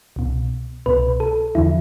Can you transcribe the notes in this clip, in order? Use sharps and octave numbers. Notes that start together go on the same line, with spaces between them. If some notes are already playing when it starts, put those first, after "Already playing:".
C2 B2
C2 B2 B4
A4
E2 D3 F3 E4